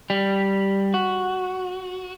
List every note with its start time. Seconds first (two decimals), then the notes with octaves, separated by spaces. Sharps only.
0.10 G3
0.94 F#4